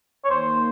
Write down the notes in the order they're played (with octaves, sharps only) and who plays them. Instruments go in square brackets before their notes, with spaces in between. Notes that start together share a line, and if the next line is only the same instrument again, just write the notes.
[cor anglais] C#5
[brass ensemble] D#2 D#3 A#3 [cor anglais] C5